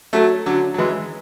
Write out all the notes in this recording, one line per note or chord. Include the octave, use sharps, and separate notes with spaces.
F#3 A3
D3 F#3
F#3
E3 G#3